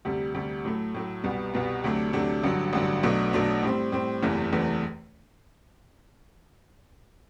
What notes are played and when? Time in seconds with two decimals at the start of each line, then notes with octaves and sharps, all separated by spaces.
0.05 D2 C3 G3
0.34 D2 C3 G3
0.65 A2 F#3 A3
0.94 A2 F#3 A3
1.24 C2 B2 G3 B3
1.54 C2 B2 G3 B3
1.84 D2 C3 F#3 A3 D4
2.13 D2 C3 F#3 A3 D4
2.44 A1 G2 D3 F#3
2.73 A1 G2 D3 F#3
3.03 B1 B2 F#3 A3 D4
3.33 B1 B2 F#3 A3 D4
3.62 A2 G3 C4
3.92 A2 G3 C4
4.22 F#1 E2 C3 E3 A3
4.52 F#1 E2 C3 E3 A3